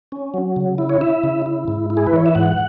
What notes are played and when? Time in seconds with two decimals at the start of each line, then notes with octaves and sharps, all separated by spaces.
0.12 C#4
0.34 F#3
0.56 C#3
0.78 E4
0.89 C#5
1.01 E4 E5
1.24 C#3
1.46 E4
1.68 G#2
1.90 E4
1.97 G#4
2.07 B4
2.13 E3 C#5
2.26 E5
2.35 G#2 F#5